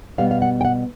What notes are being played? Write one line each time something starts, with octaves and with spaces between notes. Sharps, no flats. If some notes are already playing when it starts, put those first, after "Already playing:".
B2 G3 B3 F5
F5
F#5
G5
F#5